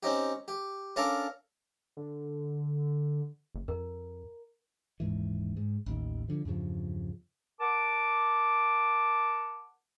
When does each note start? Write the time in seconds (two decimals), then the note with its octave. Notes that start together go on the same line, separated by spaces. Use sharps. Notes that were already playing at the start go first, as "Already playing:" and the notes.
0.03 C4 C#4 D#4 G4
0.48 G4
0.96 C#4 D4 A4 A#4 D5 F5
1.97 D3
3.55 F#1
3.68 F2 A#4
5.00 D#1 G#2 E3
5.57 G#2
5.86 A1 D#2 D#3
6.28 D3 F3
6.45 E2 G2 C#3 F3
7.61 A#4 F#5 A5 D6